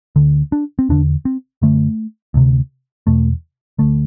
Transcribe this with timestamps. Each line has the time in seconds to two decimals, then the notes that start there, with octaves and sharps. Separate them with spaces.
0.16 D2 D3
0.52 D4
0.79 C4
0.89 E2 D3 D4
1.25 C4
1.62 F#2 D3 A3
2.34 D2 C3
3.07 E2 B2 A3
3.79 D2 D3 A3